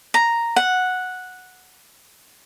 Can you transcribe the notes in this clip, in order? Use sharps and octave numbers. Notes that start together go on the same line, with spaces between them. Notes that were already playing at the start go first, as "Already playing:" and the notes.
A#5
F#5